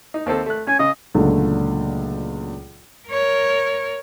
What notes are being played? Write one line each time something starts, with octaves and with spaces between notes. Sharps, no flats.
D#4
D#2 C4 A4
A3 F#6
C#4 G#5
C#3 D#5
C#2 A#2 D3 F#3 A3
A#4 C#5